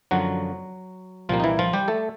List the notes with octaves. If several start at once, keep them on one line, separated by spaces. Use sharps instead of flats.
F#2 D3 F3 F#3 F#4
C2 A#2 F3 G3 A#3 F4
D#4
E3 E4
F3 F4
G3 G4
A3 A4